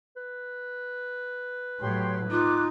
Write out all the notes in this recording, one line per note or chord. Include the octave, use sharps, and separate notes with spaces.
B4
A2 F#3 G4 C#5 C6
D#4 F4 D6 F#6